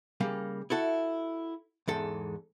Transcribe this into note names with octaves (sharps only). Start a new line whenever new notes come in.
C#3 G3 A#3
E4 F#4 A4
E2 G#2 A4